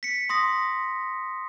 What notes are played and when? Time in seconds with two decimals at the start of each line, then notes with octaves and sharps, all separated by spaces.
0.03 B6 C#7
0.29 C6 D#6 A#6